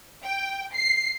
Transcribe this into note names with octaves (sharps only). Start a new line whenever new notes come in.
G5
C7